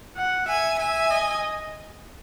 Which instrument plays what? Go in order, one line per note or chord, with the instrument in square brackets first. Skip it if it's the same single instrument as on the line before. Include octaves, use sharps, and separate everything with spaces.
[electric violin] F#5
[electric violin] E5 [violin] G#5
[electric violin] E5 [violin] G#5
[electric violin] D#5